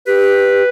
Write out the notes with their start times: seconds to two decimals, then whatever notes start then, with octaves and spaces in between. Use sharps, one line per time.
0.07 G4 B4